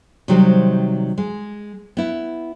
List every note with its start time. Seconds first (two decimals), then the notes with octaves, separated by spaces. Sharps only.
0.28 C3 D#3 F#3 G3 G4 C5
1.18 G#3
1.97 B3 E4